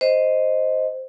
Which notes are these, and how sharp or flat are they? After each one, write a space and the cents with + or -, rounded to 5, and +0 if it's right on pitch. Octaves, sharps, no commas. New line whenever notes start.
C5 +0 D#5 +0